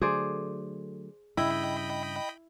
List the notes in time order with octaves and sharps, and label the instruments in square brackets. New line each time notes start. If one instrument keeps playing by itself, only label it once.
[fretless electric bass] D3 F#3 A3 [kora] G#4 C5 D5
[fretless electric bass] G2 C#3 [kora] E4 [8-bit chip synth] D#5 G5 B5